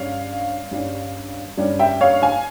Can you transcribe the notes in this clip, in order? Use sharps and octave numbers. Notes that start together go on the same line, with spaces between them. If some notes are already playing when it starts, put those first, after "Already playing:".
Already playing: G2 G3 C#4 C#5 F5
G2 G3 C#4
G2 G3 C#4
E5 G5
C#5 F5
F5 G#5